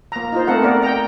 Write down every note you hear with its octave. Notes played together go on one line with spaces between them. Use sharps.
A#3 A#5
D#4 F4 C5
A3 C4 A4 A#4 F#5
B3 A#4 D5
G5 A#5